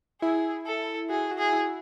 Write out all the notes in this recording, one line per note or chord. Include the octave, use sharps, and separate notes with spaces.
E4 G#4
A4
F#4 G#4
F#4
G#4
E4